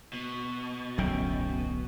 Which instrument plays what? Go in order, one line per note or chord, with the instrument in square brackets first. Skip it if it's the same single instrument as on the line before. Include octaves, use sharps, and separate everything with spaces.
[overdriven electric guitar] B2
[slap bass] D1 B1 A2 [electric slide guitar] F#2 C#4 G5